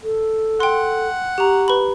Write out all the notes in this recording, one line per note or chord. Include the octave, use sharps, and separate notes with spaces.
A4
F#5 G5 C6
G4 A#5 C#6
B4 B5